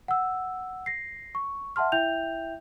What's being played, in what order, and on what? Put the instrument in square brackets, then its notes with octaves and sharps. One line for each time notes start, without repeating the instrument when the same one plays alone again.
[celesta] F#5 E6
A#6 C7
C#6
E5 F#5 A5 C6 F6
E4 E5 G5 G6 F7